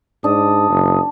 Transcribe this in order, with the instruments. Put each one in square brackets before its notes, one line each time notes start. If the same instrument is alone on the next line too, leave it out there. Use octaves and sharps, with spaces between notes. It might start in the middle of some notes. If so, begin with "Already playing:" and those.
[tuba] G#2 [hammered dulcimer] D4 [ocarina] D#6
[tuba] F#1